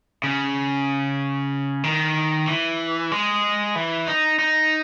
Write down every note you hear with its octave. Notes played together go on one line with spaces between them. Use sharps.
C#3
D#3
E3
G#3
E3
D#4
D#4